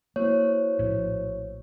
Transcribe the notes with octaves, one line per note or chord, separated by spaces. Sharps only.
A#3 E4 F#4 C5 C#5
A#1 A2